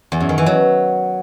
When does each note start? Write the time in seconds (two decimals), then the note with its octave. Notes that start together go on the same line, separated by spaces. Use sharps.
0.12 E2
0.20 F#2
0.29 D#3
0.38 E3
0.46 F#3